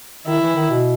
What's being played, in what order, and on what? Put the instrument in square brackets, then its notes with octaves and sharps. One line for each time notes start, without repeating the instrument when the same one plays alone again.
[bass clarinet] D#3 [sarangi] E4
[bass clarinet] E3
D#3
B2